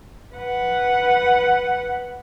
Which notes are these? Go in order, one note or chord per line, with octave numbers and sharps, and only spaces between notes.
B4 F#5